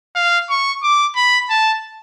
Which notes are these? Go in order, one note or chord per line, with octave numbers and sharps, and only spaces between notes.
F5
C#6
D6
B5
A5